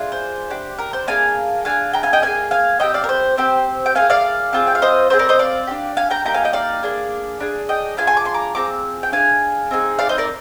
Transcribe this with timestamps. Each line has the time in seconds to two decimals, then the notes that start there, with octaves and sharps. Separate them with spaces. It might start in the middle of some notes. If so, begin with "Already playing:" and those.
Already playing: D4 F4 G#4
0.12 C5
0.50 D4 G4
0.78 A#4
0.93 C5
1.08 A#3 D4 G#4 F5 G#5
1.65 D4 G#4 F5 G#5
1.93 G5 A#5
2.03 F5 G#5
2.13 D#5 G5
2.22 A#3 D#4 G#4 F5 G#5
2.51 F5 G#5
2.80 C4 G4 D#5 G5
2.94 D5 F5
3.04 A#4
3.09 C5
3.37 C4 G4 C5
3.86 G5
3.95 A#3 F4 G#4 F5 G#5
4.10 D5 F5
4.53 C4 F4 G#4
4.67 G5
4.75 F5
4.82 C5 D#5
5.10 C4 F4 G#4 C5
5.19 A#4 D5
5.29 C5 D#5
5.39 D5 F5
5.67 D4 G4
5.97 F5 G#5
6.10 G5 A#5
6.25 A#3 D#4 G4 G5 A#5
6.34 F5 G#5
6.45 D#5 G5
6.53 D5 F5
6.83 A#3 D4 G#4
7.40 D4 G#4
7.69 D#5 G5
7.97 D4 F4 G#4 F5 G#5
8.07 G#5 C6
8.17 D6
8.25 C6
8.34 A#5 D6
8.55 C4 F4 G#4 A#5 D6
9.03 G5
9.12 D4 G#4 F5 G#5
9.71 C4 D#4 G#4
9.99 D5 F5
10.09 C5 D#5
10.18 A#4 D5